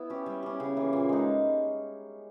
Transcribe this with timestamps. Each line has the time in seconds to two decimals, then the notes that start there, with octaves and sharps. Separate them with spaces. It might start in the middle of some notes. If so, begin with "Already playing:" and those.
Already playing: B3 E4
0.10 C#4 G4
0.26 G3
0.43 C#4 G4
0.60 C#3
0.77 E3 A#3
0.93 A#2
1.09 G#3 D#4